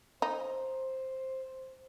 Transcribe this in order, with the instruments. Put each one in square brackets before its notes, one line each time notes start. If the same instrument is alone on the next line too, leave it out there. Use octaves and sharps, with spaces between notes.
[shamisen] D#4 [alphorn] C5